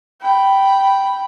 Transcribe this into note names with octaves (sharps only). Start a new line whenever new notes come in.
G5 B5